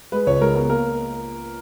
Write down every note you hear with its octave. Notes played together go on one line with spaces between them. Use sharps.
G#3 B4
C#2 C#5
G#3 A#4
B3 A#4
A#3 A#4